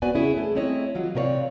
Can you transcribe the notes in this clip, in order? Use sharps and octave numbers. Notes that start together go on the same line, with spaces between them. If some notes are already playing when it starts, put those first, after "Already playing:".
A#3 B3 F#4 B4 D5 G#5
C#3 C#4 E4 G#4
A3
A3 C4 E4 C#5 D#5
E3 F#3 F4
C3 C4 A#4 C#5 D5 F5